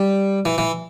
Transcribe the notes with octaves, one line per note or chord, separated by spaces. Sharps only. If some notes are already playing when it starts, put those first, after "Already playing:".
Already playing: G3
E3
E3